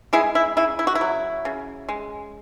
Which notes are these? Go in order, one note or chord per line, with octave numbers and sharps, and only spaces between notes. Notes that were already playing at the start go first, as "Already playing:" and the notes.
G#3 E4 G#4
E4
C#3 E4
E4
F#4
E4
F#3
C#3
G#3